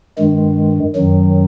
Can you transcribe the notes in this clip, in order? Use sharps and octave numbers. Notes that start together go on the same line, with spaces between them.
G2 D#3 G#3
F#2 D#3 F#3